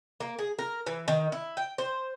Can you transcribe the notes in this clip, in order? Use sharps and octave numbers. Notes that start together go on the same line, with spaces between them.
A#3
G#4
A#4
E3
D#3
E4
G5
C5